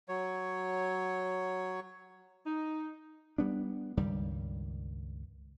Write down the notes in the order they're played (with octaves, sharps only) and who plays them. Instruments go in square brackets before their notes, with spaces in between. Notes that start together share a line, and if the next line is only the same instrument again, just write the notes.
[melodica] F#3 C#5
[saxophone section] D#4
[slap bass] G3 B3 D4
C#2 G2 D#3 G3